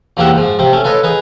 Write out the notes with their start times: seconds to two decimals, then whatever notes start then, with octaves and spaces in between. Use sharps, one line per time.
0.17 E2 F3 A#3 G4 E5 F#5
0.36 G#2 F3
0.59 C3 C4
0.73 A3 C#4
0.84 F4 A4 B4 C#5 D#5
1.04 D#4 G#4 B4